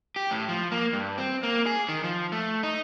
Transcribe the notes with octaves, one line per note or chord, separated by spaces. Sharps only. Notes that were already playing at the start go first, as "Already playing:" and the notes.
G4
A2
F3
A#3
G2
C4
A#3
G#4
D#3
F3
A3
D#4